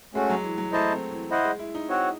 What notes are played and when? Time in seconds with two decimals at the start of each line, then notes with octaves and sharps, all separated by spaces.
0.14 G#3 A3 C#4 F#4
0.30 F#3
0.43 E3
0.58 F#3
0.73 A3 E4 C5 D#5 A5
0.92 C4
1.11 E3
1.30 E4 C5 D#5 F#5
1.45 G#3
1.59 E4
1.75 D#4
1.89 C4 F#4 C#5 F#5